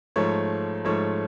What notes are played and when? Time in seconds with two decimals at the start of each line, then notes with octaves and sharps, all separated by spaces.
0.16 G#2 F3 A3 C#5
0.85 G#2 F3 A3 C#5